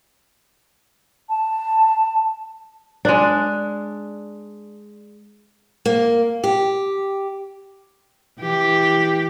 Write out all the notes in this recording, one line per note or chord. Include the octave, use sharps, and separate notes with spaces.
A5
G#3 D4
A#3
G4
E3 G4